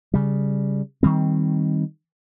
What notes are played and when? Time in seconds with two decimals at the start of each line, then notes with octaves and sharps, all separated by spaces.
0.14 C#3 G3
1.03 D#3 G3 C4